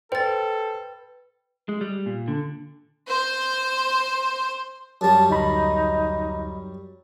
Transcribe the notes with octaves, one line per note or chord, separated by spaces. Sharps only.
A4 B4 C5 G5 A6
G#3
G3
A#2
D3
C5 C6
F#2 G3 A5
D2 D#4 B5